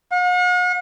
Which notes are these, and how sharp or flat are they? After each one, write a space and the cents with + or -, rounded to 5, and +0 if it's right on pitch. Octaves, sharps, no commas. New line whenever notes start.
F#5 -45